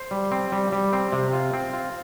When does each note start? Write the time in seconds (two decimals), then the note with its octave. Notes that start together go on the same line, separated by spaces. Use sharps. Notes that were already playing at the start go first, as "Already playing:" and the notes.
Already playing: C5
0.11 G3
0.31 C4
0.52 G3
0.72 G3
0.93 C4
1.12 C3
1.33 F4
1.53 C4
1.73 F4